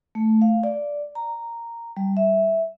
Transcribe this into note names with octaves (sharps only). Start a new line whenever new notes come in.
A3
F5
D5
A#5
G3
E5